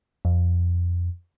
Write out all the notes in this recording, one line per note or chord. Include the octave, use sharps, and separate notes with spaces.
F2